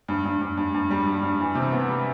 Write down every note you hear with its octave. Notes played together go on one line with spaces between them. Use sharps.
G2
G2
G2
G2
G2
G3
G2
G2
E3
C3
B3
G3